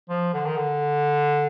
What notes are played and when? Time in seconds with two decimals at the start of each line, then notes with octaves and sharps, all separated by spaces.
0.09 F3
0.34 D3
0.46 D#3
0.57 D3